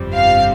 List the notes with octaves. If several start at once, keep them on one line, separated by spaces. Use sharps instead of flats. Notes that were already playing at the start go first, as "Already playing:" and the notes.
Already playing: G1 F2 C3 G3 C4
F5